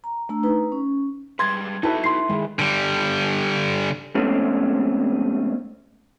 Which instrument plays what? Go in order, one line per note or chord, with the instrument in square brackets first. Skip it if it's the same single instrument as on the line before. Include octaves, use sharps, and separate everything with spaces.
[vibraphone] A#5
A3 D4 A#5 E6
D#4 B4 A#5
C#4
[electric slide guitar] G3 G#3 B4 [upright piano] C6 G#6 A6
[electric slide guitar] D#4 F#4 [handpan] E4 [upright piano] A4 B4 A5
[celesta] C6 C7
[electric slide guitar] D#3 [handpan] G#3
[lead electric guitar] D3 G3
[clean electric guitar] F2 G#2 B2 A3 C4 C#4